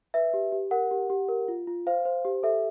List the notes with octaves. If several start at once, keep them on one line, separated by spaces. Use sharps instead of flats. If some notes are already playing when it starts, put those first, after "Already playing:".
B4 E5
G4
G4
A#4 F#5
G4
G4
A#4
F4
F4
C5 F5
C5
G4
A4 E5